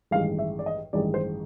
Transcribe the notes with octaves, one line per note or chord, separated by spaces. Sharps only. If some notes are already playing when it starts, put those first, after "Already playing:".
A1 G2 D#3 G#3 F5
E5
D5
D#5
A1 G2 D#3 G#3 D5
C5